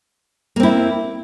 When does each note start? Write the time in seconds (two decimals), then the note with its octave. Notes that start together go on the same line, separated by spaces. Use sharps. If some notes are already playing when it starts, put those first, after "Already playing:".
0.56 A#3
0.60 C4
0.63 E4